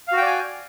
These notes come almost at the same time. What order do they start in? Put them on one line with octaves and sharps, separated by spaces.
F5 F#4 G5 D5 G#5